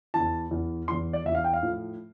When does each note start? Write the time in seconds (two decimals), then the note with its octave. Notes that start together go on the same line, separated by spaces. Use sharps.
0.14 E2 E3 A5
0.51 E2 E3
0.88 E2 E3 C6
1.13 D5
1.25 E2 E5
1.30 E3 F5
1.44 G5
1.53 F5
1.63 A2 F3